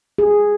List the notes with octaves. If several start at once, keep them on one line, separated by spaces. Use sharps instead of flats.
G#4